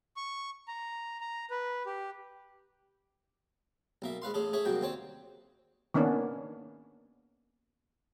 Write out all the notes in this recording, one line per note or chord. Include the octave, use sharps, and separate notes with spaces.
C#6
A#5
A#5
B4
G4
B1 A#3 E5
G#2 B4 F5 C6
A1 C#4 G#4 A4
G#4 A4 C#5 E5
C2 F#2 A#3 F#4 G5
D#2 C4 C#5 D5
D#3 A#3 B3 C#4 D4